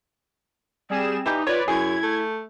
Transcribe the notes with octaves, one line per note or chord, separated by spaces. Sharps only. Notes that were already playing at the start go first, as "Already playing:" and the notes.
G3 C4 G#4 E7
E3 G3 D#4 G4
F4 B4 C#5 D5
F#2 E4 G#4 G#6
A3